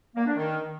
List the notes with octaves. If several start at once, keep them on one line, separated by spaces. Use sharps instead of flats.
A#3
D4
D#3